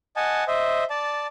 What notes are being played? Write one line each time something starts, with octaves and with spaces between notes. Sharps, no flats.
D#5 F#5 G#5 A5
C5 D#5 E5
D5 A5